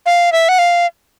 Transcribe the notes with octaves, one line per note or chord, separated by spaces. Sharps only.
F5
E5
F#5
F5